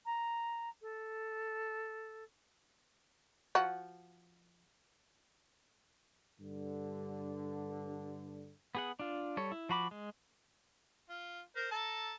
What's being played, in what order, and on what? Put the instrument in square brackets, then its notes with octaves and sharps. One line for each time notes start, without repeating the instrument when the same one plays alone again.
[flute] A#5
A4
[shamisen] F3 F#4
[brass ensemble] G2 D3
[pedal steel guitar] B3 G#4 F#5
D4 F4
G3 A4 C#5
E4
F3 F#4 B5 D6
G#3
[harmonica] F4
A#4 C5
A4 A5 A#5